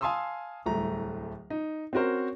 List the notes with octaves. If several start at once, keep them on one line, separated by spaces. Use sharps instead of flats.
F5 G#5 A5 C6 D#6 E6
D1 C2 A3 A#5
D#4
C4 C#4 F#4 A#4 C5